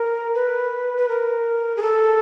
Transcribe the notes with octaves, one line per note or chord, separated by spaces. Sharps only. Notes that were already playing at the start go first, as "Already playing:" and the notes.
Already playing: A#4
B4
B4
A#4
G#4
A4